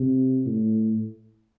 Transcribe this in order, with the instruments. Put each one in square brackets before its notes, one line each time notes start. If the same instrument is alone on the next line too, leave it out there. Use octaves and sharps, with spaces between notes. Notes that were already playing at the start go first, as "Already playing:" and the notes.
Already playing: [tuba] C3
A2